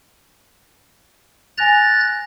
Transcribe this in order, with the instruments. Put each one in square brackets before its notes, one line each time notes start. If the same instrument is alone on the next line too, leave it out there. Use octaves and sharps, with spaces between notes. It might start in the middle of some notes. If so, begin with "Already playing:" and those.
[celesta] G#5 A#6 F7 [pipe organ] F#6 A6